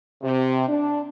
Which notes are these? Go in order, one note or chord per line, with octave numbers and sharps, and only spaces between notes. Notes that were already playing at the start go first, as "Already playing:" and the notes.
C3
D4